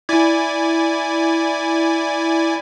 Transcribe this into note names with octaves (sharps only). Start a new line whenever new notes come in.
E4 D5 G#5